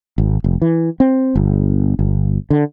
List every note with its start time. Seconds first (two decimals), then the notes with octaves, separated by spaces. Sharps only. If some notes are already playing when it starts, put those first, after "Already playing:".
0.18 G#1
0.44 F1
0.62 E3
1.00 C4
1.35 G1
1.99 G1
2.50 D3